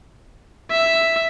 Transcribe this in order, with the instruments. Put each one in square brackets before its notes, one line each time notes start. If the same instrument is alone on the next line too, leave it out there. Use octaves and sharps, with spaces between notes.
[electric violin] E5